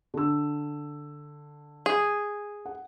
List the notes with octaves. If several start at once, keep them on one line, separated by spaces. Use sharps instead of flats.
D3 E6
G#4
F#5